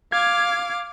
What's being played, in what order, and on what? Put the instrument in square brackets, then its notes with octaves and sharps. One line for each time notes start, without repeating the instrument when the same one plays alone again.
[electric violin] F5 D6 [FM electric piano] G#6